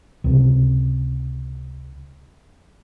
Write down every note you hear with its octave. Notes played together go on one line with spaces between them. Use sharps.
C#2 C3